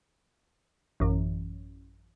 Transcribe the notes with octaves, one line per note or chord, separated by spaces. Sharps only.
A1 F#2